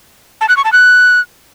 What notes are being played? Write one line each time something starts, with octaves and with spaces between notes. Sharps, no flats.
A5
F#6
C#6
A5
F#6